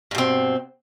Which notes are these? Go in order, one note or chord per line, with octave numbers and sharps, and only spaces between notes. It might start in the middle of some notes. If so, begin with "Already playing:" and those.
G2 B2 C4